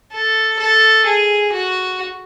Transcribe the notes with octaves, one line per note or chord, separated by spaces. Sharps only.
A4
A4
G#4
F#4